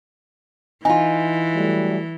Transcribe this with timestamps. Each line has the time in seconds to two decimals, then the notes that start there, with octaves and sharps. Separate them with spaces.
0.85 E3 D#4 F4 G#5
1.55 F#3 G3 A3